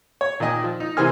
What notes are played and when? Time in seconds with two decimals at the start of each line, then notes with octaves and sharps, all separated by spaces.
0.21 C#5
0.40 A#2 D#3 D5 D#5 G#5
0.64 F3
0.80 D#4
0.97 C3 E3 A#4 C5 G#5 F6